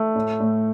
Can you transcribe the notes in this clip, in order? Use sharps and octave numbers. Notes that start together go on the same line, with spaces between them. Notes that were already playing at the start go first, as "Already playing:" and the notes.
Already playing: A3
A2
A2